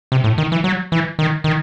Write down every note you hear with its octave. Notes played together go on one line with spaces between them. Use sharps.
C3
A2
D#3
E3
F#3
E3
D#3
D#3